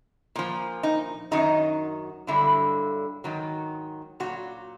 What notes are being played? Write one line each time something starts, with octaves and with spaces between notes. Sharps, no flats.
A#2 F3
D#4
F#2 D#3 F#3 D#4
G2 D3 F#3 E4
G#2 D#3 F#3
A#2 F#3 F#4